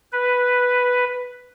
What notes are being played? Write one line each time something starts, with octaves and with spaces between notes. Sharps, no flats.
B4